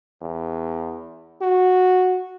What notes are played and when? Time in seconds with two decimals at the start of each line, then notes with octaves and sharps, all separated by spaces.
0.21 E2
1.41 F#4